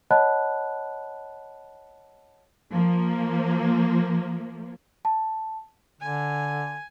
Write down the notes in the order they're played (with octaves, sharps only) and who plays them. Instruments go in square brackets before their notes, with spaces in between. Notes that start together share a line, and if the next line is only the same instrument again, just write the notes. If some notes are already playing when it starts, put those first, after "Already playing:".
[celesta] C#5 D#5 F#5 A5 B5 F#6
[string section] F3 A#3
[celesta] A5
[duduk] D3 [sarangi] G#5